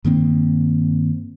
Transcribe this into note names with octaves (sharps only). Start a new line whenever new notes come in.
G2 D#3 A#3 C4